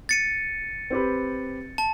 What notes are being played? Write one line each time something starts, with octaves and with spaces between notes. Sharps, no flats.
A6 C#7 D#7
C4 G4 B4
A5